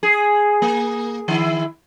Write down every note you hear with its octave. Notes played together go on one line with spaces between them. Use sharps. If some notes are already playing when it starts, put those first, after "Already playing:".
G#4
A#3
D#3 E4